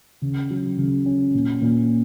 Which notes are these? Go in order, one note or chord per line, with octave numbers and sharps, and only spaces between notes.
C#3
F#3
C#3
C#4
A#2
A#2